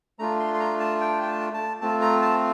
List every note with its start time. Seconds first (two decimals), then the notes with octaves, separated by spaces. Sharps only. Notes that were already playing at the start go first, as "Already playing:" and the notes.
0.19 A3 D4 F4 A#5
0.39 C6
0.54 C6
0.60 A#5
0.80 A5
1.00 G5
1.22 G5
1.27 A5
1.54 A5
1.81 A3 C4 F4 A5
2.01 A#5
2.21 A5